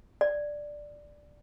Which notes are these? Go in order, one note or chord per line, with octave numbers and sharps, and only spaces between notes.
D5